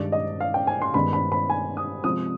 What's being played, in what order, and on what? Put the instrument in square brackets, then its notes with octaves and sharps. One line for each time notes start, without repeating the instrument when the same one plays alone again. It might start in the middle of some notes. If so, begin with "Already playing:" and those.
Already playing: [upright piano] G2 D#3 G#3 D4 D5
D#5
F5
G5
G#5
C6
G2 D#3 G#3 B3 D4 B5
B5
B5
G#5
D#6
C3 F3 G#3 D#6